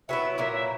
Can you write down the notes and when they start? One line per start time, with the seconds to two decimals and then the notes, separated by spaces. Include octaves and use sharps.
0.08 F#3 B3 E4 E5
0.38 A#2 F#3 A#3 E5
0.53 E5